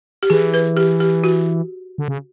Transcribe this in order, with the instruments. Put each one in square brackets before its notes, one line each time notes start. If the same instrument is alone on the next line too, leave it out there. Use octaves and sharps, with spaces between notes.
[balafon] G4
[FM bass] E3 [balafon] G#4
[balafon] B4
G4
G4
F#4
[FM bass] D3
C#3